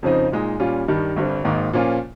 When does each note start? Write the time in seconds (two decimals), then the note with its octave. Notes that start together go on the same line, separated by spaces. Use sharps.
0.03 F2 C#3 F3 C4 D#4
0.32 A#2 G#3 D#4
0.60 A#2 G3 C#4 F4
0.88 G2 D#3 G3
1.16 G1 G2 G3 C4
1.44 G#1 G#2 D#3 A#3
1.73 A#2 F3 A#3 C#4 F4